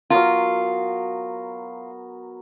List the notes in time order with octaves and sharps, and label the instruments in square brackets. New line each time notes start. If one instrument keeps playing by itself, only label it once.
[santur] F#3 B3 A#4 [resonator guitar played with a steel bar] F4